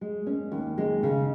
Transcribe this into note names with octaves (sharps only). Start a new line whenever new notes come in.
G#3
C#4
D#2
G#3
C#3